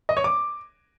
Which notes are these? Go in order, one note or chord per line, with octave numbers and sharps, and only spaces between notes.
D#5
C#5
D6